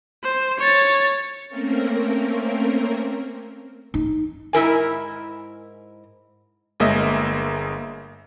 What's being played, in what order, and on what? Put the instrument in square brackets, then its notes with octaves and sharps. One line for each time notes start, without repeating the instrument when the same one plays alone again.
[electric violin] C5
C#5 A6
[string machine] A3 A#3 C4 C#4 A#4
[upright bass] D#4
[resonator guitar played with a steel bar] G#2 E4 A#4 G#5
[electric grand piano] G1 G#3 A#3 D#5 E5